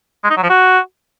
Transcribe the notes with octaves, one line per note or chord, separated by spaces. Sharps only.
G#3
D#4
F#3
F3
F#4